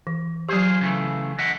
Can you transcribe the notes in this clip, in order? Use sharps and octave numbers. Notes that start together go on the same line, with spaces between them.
E3
F#3 F4 G4 G#4 C5
C#3 E3 A3
D#5 E5 F#5